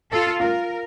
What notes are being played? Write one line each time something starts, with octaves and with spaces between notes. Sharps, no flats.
F4 A4
F4 A#4